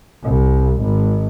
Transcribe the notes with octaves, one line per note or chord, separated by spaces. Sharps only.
C2
G#1